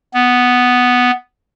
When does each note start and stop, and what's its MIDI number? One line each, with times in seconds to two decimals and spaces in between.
0.14 1.11 59